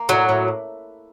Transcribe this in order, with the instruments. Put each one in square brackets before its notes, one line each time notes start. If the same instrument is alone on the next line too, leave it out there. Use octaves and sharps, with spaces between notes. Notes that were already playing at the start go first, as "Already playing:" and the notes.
Already playing: [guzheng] A#3
[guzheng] A2 [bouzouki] F#3
[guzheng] A2